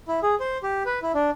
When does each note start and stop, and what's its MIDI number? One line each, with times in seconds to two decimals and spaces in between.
0.08 0.20 64
0.23 0.35 68
0.40 0.58 72
0.63 0.83 67
0.86 0.99 71
1.02 1.12 64
1.14 1.30 62